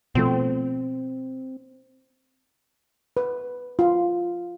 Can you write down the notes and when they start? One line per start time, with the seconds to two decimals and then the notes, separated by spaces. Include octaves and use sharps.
0.15 B2 F3 A3 C4
3.17 B4
3.79 F4